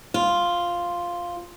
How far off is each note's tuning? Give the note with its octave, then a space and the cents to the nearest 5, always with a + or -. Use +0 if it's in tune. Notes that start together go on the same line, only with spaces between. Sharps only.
F4 +0 C5 +0